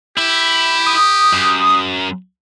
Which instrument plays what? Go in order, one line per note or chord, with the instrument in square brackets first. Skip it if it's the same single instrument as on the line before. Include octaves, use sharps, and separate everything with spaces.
[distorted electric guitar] E4 [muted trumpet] G4
[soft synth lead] D#6
[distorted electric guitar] F#2